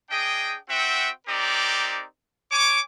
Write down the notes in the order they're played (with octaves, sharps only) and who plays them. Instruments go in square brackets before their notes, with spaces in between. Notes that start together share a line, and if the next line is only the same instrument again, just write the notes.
[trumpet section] D4 G#4 D#5 G5
C4 F#4 E5 F#5 G5
C4 D#4 G4 A#4 D5
C#5 G#5 C#6 D6